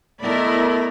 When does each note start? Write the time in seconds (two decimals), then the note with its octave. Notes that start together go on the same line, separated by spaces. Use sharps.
0.21 A3 B3 E4 A#4 D5 D#5 B5